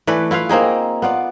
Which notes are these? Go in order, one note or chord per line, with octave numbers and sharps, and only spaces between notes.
E3 A3 B4 D5
E4 F4 B4 F5
A#3 C4 D#4 G#4
B3 F4 D5